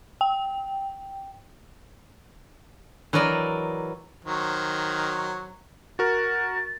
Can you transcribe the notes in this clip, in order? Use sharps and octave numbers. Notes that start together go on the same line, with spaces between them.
G5
E3 F#3 A#4 D5 D#5
D#3 F#3 C5
F#4 A#4 A6